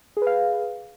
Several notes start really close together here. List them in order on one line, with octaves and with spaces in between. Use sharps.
G#4 B4 F5